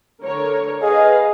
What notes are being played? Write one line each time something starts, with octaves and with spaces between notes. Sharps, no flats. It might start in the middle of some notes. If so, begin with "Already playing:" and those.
D3 A#4 C#5
G#4 B4 D#5 F5